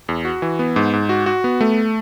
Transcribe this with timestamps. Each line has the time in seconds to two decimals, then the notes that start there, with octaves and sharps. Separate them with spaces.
0.09 E2
0.25 F#4
0.42 E3
0.59 B3
0.76 G#2
0.93 G#2
1.09 F#4
1.26 F#4
1.44 B3
1.61 A3